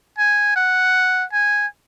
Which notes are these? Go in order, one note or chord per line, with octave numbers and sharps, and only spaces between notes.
G#5
F#5
G#5